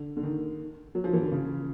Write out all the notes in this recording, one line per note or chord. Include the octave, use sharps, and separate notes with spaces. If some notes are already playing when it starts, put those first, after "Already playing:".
Already playing: D3
D3
D#3
F#3
F3
E3
D3
C#3